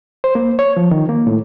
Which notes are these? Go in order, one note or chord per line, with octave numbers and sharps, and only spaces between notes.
C5
A#3
C#5
F3
D#3
A#3
A2